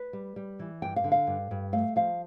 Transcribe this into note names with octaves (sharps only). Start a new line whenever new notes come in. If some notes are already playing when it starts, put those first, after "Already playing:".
Already playing: B4
G3
G3
E3
G2 G5
F5
D3
F5
G2
G2
A3 F5
F3 F5